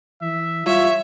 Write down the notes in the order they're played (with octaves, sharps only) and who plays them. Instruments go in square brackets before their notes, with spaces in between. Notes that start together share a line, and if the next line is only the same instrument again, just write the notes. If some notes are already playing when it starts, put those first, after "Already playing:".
[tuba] E3 [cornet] E5
[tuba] G3 [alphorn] F4 [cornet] C#5 [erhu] E5